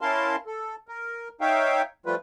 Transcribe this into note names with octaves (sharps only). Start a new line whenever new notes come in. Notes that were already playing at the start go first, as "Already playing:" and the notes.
C#4 E4 A#4 F5 A5 C6
A4
A#4
D#4 C#5 E5 F5 G5
F3 G3 A3 F4 B4